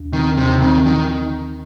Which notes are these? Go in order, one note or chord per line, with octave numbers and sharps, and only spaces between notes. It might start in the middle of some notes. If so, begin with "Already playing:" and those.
Already playing: D#2
D#3 C4
D#2 C3
D#3 C4
D#3